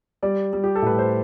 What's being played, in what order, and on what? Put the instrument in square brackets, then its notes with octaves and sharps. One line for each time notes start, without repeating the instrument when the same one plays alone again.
[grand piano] G3 D5
G3
G4
A4
A2 B4
C5